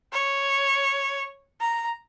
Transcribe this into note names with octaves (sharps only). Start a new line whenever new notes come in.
C#5
A#5